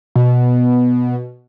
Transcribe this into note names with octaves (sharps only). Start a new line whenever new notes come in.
B2